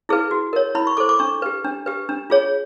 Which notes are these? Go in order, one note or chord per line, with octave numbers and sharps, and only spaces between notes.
E4 G#4 B4
F#4
A#4 C#5
E4 B5
C#6
A4 C5 D6
D6
D4 C#6
G4 B4
D4
G4 B4
D4
F4 G#4 C#5